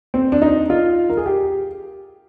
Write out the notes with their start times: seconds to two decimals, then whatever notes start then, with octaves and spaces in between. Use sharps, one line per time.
0.14 C4
0.32 D4
0.42 D#4
0.70 F4
1.10 A#4
1.17 G#4
1.26 G4